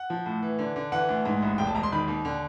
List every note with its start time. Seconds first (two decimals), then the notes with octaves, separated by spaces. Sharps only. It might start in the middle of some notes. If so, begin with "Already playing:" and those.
Already playing: F#5
0.10 F3
0.26 A2
0.42 E3
0.59 D3
0.76 D3
0.92 E3 F#5
1.09 D2
1.25 G#2
1.42 A1
1.58 E1 G5
1.67 A5
1.75 E1 A#5
1.83 C6
1.92 D#3 B5
2.08 D#2
2.25 D3